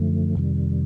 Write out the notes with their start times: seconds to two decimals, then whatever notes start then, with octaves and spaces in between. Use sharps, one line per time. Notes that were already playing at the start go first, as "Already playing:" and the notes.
Already playing: F#2 D3 F3 A3
0.36 F2 C3 D#3 G3